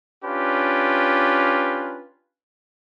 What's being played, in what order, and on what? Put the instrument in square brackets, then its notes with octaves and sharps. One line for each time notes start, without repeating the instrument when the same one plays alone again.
[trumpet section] C#4 D4 F4 G4 B4